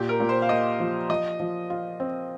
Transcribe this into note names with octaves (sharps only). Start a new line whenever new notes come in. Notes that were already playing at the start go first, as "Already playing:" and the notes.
Already playing: A#2 G4
A#4
A#2
C5
F5
A#3 D#5
F3
F3 D#5
F3
F4
C4